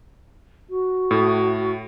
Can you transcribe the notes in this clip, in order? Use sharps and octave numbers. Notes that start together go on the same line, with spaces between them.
F#4
A2